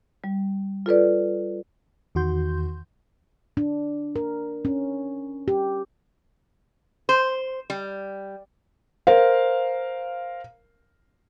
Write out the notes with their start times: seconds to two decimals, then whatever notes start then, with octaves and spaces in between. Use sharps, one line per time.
0.24 G3
0.86 F4 A4 B4 D5
2.15 E2 D#3 F#4 C6 G6
3.57 D4
4.16 A#4
4.65 C#4
5.48 G4
7.09 C5
7.70 G3
9.07 A#4 C5 F5